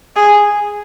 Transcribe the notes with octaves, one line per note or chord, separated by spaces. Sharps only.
G#4